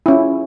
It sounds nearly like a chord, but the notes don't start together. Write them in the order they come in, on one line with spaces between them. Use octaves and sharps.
E4 C#4 F4